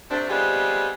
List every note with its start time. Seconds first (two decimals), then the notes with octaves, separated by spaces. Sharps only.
0.10 C3 A3 C4 D4
0.29 G3 B3 C4 D#4 F4 G#4